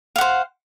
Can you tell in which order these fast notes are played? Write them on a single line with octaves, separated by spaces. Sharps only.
F5 F#5 C5